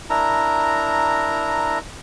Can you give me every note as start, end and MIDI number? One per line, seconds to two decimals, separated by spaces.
0.10 1.79 62
0.10 1.79 64
0.10 1.79 70
0.10 1.79 82